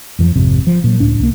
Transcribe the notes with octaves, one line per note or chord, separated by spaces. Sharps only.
F2 E3 F3
G#1 F2 C3
F3
A#2 F#3
C#2 A2 D4
C2 A#3